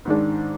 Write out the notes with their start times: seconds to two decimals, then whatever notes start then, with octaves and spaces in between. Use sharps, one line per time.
0.05 G#2 D#3 G#3 D4